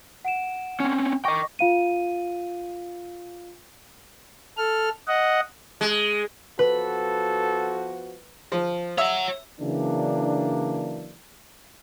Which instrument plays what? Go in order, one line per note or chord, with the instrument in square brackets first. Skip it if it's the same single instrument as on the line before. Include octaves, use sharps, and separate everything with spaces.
[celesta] F#5 D7 E7
[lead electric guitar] C4 C#4
[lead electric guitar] D#5 G5 [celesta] C#6 D6 A#6
[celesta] F4 F5 D#7
[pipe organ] A4 F6
D#5 F#5
[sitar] G#3
[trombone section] F3 B3 F#4 [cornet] A4 [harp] B4
[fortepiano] F3
[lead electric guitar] C#5 F#5 [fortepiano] E5
[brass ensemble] C#3 E3 F#3 A#3 D4